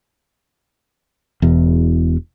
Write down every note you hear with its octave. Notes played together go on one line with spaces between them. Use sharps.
E1 E2